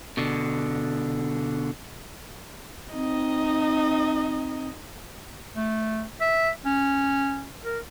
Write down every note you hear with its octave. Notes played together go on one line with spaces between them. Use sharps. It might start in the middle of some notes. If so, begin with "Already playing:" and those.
B2 D3
C4 D#4 D#5
A3
E5
C#4
A#4